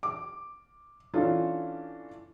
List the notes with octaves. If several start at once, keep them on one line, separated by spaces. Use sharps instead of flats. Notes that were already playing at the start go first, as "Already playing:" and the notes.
D6
E3 C#4 D4 F4 A4